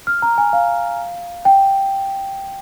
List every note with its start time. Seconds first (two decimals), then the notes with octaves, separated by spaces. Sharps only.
0.07 F6
0.22 A#5
0.38 G#5
0.53 F5
1.45 G5